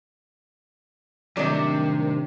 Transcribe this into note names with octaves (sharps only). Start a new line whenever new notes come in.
A2 C3 D#3 F#3 G3 D4 D#5